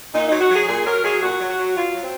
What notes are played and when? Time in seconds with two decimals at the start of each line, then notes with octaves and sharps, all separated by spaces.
0.14 A#2 D#4
0.27 F#3 D#4
0.41 F#4
0.50 F#3
0.55 G#4
0.68 A#2 G#4
0.87 F#3 A#4
1.04 F#3 G#4
1.22 A#2 F#4
1.40 F#3
1.49 F#4
1.58 F#3
1.77 F#3 F4
1.95 F#3
2.02 C4